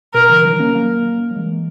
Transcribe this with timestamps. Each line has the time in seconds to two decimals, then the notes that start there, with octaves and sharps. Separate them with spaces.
0.14 B2 A#4
0.29 C#3 E3
0.45 D#3 F#3
0.59 A#3 C#4
0.75 F#3 A#3
1.31 F#3
1.36 E3 G#3